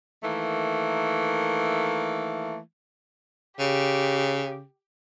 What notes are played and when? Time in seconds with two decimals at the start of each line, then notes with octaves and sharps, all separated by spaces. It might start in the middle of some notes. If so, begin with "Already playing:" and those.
0.23 D#3 E3 A3 A#3
3.59 C#3 G4